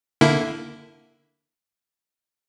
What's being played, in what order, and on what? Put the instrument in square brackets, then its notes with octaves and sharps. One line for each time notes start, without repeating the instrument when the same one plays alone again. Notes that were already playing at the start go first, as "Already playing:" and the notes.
[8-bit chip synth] D3 A#3 E4